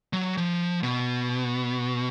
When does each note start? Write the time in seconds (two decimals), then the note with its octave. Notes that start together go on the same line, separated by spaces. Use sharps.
0.13 F#3
0.37 F3
0.83 B2